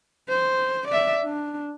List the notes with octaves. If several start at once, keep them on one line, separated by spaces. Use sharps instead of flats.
C5
D5 E5
D4